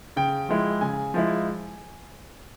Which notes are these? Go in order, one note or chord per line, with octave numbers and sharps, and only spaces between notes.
C#3 G5
F3 G#3 E4
C#3 G#5
F3 G#3 E4